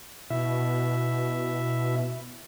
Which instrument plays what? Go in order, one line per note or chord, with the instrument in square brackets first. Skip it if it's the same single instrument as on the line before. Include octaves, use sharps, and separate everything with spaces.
[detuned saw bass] B2 [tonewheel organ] E4 E5